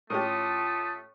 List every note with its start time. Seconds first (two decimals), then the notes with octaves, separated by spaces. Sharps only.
0.10 A2 A3 C#4 F4 G4 A5 D#6